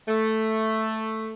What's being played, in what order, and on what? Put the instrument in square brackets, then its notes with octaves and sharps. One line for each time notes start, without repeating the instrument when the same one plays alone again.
[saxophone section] A3